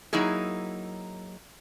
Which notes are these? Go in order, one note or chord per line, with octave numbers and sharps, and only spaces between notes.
F#3 A#3 D#4 E4 G#4